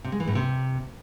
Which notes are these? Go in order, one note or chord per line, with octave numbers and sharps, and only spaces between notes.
C3
G#3
E3
A2
C3